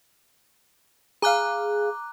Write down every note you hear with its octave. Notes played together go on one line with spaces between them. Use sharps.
G#4 F5 A#5 D6 F#6